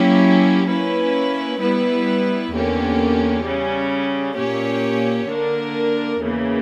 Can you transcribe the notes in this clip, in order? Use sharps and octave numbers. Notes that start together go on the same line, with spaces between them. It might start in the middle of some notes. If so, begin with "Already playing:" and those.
Already playing: F#3 A#3 C#4 E4 G4
A#3 C#4 E4 B4
G3 B3 E4 B4
E2 D3 A#3 C#4 G4
C#3 G3 C#4
A#2 A#3 C#4 G4 C#5
D3 A#3 D4 A#4
E2 C#3 E3 A#3